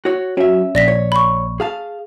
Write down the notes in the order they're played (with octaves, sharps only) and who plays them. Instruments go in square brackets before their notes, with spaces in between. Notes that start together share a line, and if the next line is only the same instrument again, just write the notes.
[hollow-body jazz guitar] F#4 C#5
[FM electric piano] F#3 [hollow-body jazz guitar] C#4 E5
[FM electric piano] A#1 [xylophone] D5 A#6 B6
[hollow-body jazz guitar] C#5
[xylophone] B5 C#6
[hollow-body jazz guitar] G#4 F5 A5